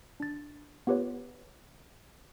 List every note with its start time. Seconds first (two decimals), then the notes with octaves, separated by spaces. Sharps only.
0.20 D4 A6
0.87 B3 F4 G4 B4 C#5